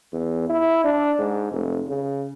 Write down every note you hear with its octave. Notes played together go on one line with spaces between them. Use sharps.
E2
E4
D4
G#2
F1
C#3